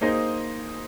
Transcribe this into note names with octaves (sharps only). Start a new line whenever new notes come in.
A#3 D#4 G#4 C5 D#5